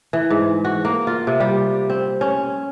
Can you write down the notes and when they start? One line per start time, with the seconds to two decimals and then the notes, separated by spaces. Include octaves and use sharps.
0.13 E3
0.30 G#2
0.65 F#4
0.85 A#3
1.07 F4
1.27 C3
1.40 G3
1.90 C4
2.21 C#4